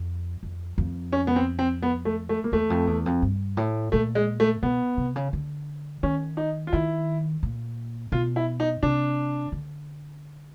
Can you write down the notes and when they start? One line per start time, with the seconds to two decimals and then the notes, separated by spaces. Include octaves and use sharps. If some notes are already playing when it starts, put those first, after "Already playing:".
Already playing: F2
0.43 F2
0.78 F2
1.13 C#4
1.27 B3
1.36 C4
1.59 C4
1.82 B3
2.05 A3
2.29 A3
2.44 A#3
2.52 E2 A3
2.70 F2
2.87 E2
3.06 F2
3.22 G2
3.57 A2
3.92 A#2 A3
4.15 G#3
4.40 A3
4.62 B2 B3
4.97 C3
5.16 C#3
5.33 D3
6.03 D#3 C#4
6.37 D#4
6.67 F4
6.73 D#3 E4
7.43 A#2
8.12 B2 F4
8.36 E4
8.60 D#4
8.83 C3 D4
9.52 D3